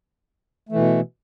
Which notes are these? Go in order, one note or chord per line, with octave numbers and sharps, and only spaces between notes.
B2 E3 A3